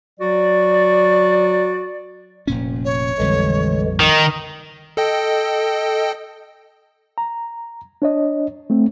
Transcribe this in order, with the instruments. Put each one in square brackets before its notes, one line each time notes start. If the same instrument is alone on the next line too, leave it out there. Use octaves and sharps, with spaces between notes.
[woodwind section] F#3 F#4 D5
[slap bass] F1 A#2 C#4
[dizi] C#5
[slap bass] A#1 F2 G3 [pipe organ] D3 E3 G#3
[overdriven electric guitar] D#3 [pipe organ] D#5
[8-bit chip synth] A4 D#5 G5
[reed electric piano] A#5
D4 C#5 D#5
A3 C4